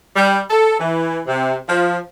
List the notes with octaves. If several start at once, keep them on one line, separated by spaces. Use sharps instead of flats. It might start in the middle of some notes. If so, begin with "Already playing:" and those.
G3
A4
E3
C3
F3